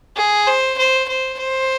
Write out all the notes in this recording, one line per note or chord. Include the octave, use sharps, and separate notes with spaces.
G#4
C5
C5
C5
C5